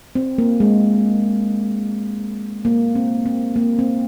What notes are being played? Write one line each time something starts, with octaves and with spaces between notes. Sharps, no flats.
C4
A#3
G#3
A#3
C4
C4
A#3
C4